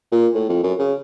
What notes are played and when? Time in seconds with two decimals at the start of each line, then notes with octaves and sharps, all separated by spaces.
0.12 A#2
0.34 A2
0.49 F2
0.63 F#2
0.79 C#3